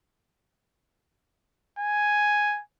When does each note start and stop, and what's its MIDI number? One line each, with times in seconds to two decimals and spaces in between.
1.79 2.61 80